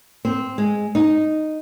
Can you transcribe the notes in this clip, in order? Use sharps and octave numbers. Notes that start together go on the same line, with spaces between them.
C4
G#3
D#4